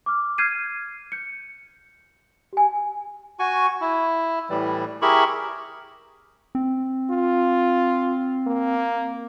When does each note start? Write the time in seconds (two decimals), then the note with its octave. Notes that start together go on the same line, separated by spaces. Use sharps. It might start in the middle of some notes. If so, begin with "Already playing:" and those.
0.06 D6 F6
0.38 F6 G6 G#6 C7 D#7
1.12 G6 C#7
2.53 G4 G#5
3.39 F#4 G#5 C#6
3.81 E4
4.50 A2 E3 G3
5.02 E4 G4 G#4 A#4 B5 C#6
6.55 C4
7.10 F4
8.47 A#3